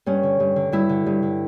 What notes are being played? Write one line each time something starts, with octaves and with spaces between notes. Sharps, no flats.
G2 C#4
D3
G2
D3
G2 E4
D3
G2
D3